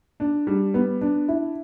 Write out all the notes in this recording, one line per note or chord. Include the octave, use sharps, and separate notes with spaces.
D4
G3
B3
D4
E4